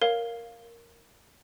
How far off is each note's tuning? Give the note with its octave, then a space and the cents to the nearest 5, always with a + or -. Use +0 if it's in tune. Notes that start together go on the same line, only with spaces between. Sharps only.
A#4 +0 C#5 +0 F5 +0